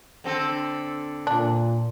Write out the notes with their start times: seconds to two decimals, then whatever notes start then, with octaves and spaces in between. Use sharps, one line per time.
0.24 D3 C4 A4
1.27 A#2 D4